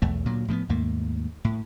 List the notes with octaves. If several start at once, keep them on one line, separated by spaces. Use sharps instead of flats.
B1 E2 A3
D2 A#2 F#3
A2 F3 A3 B3
D#2 G#2 A3 A#3
A2